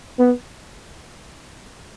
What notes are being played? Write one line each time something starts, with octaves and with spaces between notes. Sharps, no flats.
B3